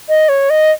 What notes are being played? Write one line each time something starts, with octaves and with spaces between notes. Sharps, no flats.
D#5
C#5
D#5